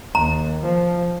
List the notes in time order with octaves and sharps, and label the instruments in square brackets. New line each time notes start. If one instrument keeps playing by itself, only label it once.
[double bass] D#2 [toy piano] A#5
[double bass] F3